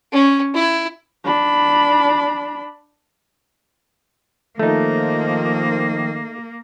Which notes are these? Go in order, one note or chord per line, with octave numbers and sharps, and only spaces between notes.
C#4
E4
D4 B5
D#3 F3 A3 A#3 D#4